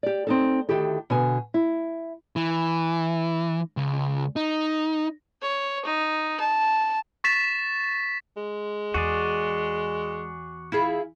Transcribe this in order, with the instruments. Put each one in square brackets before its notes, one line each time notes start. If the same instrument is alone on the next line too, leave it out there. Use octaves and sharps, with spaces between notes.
[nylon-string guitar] G4 D5
C4 D#4 A4
D2 A#2 D#3 E4 G4 A4
B2 D3 G#5
E4
[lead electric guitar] E3
C#2
D#4
[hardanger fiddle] C#5
D#4
A5
[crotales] C#6 A6 B6 E7
[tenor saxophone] G#3
[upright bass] E2 [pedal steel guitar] F#4 G#4 D5
[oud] E4 F4 G#4